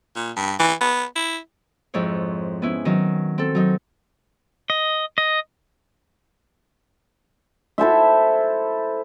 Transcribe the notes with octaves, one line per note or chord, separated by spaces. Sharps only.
A#2
G2
E3
B3
E4
F2 G#2 E4 C#5
B3 C#4 E4
D#3 F#3 C#4
C4 A4
F#3 D#4
D#5
D#5
E4 A4 C5 E5